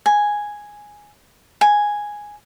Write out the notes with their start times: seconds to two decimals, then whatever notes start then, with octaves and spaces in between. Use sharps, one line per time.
0.06 G#5
1.61 G#5